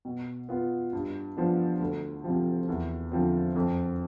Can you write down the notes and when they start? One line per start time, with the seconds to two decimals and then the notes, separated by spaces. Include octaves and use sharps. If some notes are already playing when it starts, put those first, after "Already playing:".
0.05 B2
0.49 B3 F4
0.93 G2
1.37 F3 B3 D4
1.80 D2
2.24 C3 F3
2.68 E2
3.12 D3 F3 C4
3.56 F2